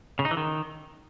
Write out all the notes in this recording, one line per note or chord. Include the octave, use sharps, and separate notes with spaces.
C#3
D#4
E3
D#3